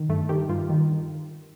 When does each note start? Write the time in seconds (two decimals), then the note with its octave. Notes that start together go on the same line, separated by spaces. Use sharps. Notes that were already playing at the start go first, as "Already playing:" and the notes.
Already playing: D#3
0.09 G2 A3
0.29 D#3 G4
0.49 G2 F4
0.70 D#3